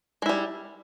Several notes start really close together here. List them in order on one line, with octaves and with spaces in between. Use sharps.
G#3 E4 G3